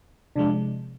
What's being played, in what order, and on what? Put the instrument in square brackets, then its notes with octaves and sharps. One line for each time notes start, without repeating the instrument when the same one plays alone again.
[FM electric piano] C3 F3 G#3 [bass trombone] D4